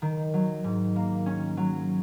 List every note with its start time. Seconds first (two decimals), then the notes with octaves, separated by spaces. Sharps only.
0.02 D#3
0.34 F#3
0.64 G#2
0.96 A#3
1.26 C#4
1.57 F#3